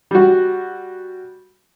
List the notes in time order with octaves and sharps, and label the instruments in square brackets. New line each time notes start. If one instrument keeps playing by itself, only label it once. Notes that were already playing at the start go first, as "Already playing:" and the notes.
[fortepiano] G3 F#4